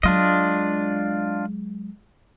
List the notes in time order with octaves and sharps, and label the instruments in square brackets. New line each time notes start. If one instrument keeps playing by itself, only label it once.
[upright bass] F#3 G#3 [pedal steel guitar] D4 F4 D#5